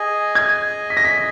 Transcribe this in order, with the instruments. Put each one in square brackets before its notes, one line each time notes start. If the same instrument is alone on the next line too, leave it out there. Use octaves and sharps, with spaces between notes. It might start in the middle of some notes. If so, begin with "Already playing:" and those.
Already playing: [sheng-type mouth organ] G#4 D#5 G#5
[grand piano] G#6
B6
A#6
B6